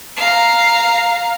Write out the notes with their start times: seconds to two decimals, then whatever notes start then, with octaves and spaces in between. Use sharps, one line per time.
0.16 F5 A#5